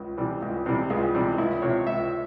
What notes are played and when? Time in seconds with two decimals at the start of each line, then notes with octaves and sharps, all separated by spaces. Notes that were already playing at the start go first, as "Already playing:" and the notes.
Already playing: C#2
0.17 C3 E3 G3
0.42 C#2
0.66 C3 E3 G3
0.90 C#2 G#4
1.15 C3 E3 G3
1.38 C#2 E4
1.62 C3 F3 C#5
1.87 C#2 E5